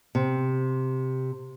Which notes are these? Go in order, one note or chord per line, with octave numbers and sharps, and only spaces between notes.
C3